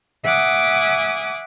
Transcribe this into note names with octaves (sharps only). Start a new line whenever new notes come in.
E5 F#5 G#5 D6 D#6